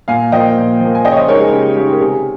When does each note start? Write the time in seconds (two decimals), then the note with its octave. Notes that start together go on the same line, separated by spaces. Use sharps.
0.08 A#2 F5 G#5
0.32 F3 A#3 D#5 G5
0.56 A#2
0.80 F3 A#3
0.95 G#5
1.05 C#3 D#5 G5
1.11 C#5
1.16 C5 D#5
1.28 G#3 D#4 A#4 C#5
1.40 G#4
1.52 C#3 G4
1.76 G#3 D#4 G4
1.92 A#4
2.01 C3 G#4